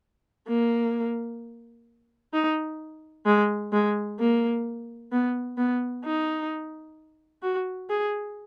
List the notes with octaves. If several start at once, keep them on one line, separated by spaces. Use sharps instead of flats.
A#3
D#4
G#3
G#3
A#3
B3
B3
D#4
F#4
G#4